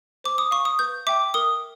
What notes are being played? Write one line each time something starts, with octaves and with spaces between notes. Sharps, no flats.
C5 D6
D#6
F5 C#6
D#6
B4 G6
E5 G5 D6
A#4 D#6